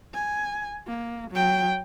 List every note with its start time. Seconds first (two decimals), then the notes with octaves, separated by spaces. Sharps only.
0.14 G#5
0.87 A#3
1.31 F#3 G5